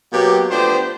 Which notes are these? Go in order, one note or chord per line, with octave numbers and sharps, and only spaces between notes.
B2 F#3 A#3 G4
F3 A3 B3 D4 G4 C5